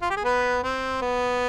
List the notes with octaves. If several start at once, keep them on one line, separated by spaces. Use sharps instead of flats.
F4
G4
G#4
B3 B4
C4
B3